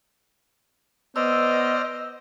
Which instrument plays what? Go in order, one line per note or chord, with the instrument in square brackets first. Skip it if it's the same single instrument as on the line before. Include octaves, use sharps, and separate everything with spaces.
[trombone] B3 [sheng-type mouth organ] C5 D5 F6 [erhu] D#5 [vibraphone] E6